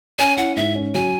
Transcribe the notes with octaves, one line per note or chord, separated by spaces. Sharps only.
C#4 G#5
E4 F#5
G#2 E5
C#4
F#3 G#5